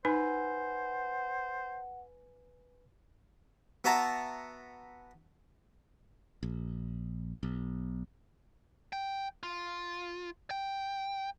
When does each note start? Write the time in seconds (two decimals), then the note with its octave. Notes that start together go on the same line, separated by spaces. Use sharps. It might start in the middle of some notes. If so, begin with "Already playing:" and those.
0.05 D#4 B4 C5 F#5 G#5
3.84 B3 F#4 E5 A5 A#5
6.43 A#1
7.43 B1
8.93 G5
9.43 F4
10.51 G5